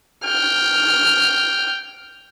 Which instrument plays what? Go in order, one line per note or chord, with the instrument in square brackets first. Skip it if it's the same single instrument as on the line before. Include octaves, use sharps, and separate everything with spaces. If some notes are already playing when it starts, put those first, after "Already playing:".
[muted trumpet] G5 [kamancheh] F6